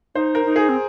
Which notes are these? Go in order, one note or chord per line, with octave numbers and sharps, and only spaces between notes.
D#4 C5
A#4
D#4
G#4
C4